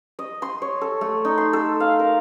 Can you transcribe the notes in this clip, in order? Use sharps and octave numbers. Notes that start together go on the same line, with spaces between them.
D#5
C6
C#5
A4
A3
D#4
C6
A4
F5
A#4